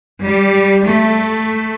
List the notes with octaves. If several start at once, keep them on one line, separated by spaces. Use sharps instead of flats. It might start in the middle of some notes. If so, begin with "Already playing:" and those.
G3
A3